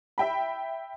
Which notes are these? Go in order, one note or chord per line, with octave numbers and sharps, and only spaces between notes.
E5 G5 B5